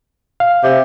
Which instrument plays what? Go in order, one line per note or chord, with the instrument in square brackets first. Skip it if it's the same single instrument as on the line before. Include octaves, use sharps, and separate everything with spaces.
[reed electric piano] F5
[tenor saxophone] C3